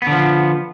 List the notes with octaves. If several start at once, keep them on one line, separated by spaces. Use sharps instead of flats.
D3 F3 B3